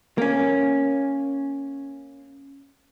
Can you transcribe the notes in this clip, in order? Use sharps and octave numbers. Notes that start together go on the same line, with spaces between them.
A#3 C#4